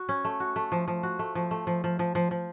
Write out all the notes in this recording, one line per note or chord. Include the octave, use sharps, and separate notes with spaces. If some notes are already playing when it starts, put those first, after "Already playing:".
Already playing: F#4
C#4
A3
F#4
A3
F3
F3
F#4
A3
F3
A3
F3
F3
F3
F3
F3